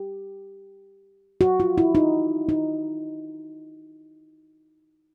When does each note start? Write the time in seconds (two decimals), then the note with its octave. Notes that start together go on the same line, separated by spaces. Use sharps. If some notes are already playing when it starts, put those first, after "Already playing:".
Already playing: G4
1.41 F#4
1.60 F4
1.78 E4
1.95 D#4
2.49 D#4